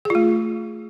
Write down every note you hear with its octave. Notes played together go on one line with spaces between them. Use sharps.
A3 F4 G#4